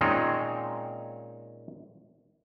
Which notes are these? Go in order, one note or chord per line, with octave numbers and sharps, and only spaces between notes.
A#2 D#3 G#3 C4 C#4 D#4